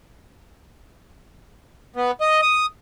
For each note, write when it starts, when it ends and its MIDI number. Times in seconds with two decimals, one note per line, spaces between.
1.96 2.11 59
2.21 2.41 75
2.42 2.66 87